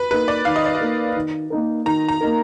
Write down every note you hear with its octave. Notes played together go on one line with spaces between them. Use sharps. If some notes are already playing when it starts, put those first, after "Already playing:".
Already playing: B4
A#3 D#4 A#4 B4
D5
D#3 F5
D#5
D5
D#5
A#3 D#4 A#4
D#3
A#3 D#4 A#4
D#3 A#5
A#5
A#3 D#4 A#4